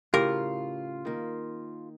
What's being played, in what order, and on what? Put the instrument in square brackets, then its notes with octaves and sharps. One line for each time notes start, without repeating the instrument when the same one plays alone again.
[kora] A2 C#3 [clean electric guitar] F4 [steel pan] G4 [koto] A#4
[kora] D#3 A#3